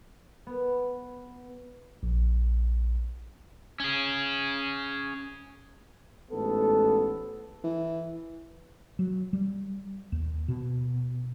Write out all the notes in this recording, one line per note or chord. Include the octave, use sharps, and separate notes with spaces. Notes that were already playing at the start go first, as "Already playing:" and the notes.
B3
A#1
C#4 G#4
A1 G#2 B3 A4
E3
F#3
G3
D#2
B2